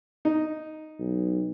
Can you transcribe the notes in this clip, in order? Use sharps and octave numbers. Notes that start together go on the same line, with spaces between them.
D#4
B1